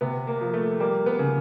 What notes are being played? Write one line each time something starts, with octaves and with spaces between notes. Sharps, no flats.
C3 B3
A#3
F3
A3
G3 A#3
B3
C#3